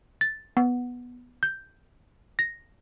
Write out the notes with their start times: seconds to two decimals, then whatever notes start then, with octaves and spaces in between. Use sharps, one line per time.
0.21 A6
0.57 B3
1.43 G6
2.39 A#6